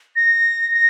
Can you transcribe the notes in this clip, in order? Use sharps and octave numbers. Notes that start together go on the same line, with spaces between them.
A#6
A#6